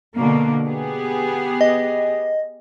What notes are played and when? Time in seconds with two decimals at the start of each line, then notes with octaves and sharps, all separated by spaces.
0.16 B2 D3 A#3
0.65 B3 G4 G#4
1.61 D#5